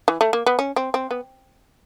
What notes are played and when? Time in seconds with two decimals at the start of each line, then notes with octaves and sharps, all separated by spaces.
0.08 E3
0.21 A3
0.33 A#3
0.46 B3
0.59 C#4
0.76 C4
0.94 C4
1.11 B3